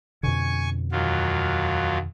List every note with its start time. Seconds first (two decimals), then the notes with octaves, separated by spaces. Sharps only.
0.23 F2 B2 D3 G#5 C#6
0.92 D#2 F#3 F4